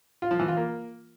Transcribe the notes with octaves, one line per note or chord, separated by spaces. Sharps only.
F4
F3
E3
F4
A#3